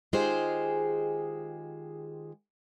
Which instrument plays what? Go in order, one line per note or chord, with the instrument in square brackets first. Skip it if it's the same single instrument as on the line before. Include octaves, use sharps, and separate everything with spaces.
[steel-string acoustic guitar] D#3 G#3 F4 G4 G#4 C5